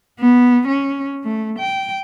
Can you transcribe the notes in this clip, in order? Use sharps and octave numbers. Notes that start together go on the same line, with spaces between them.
B3
C#4
A3
G5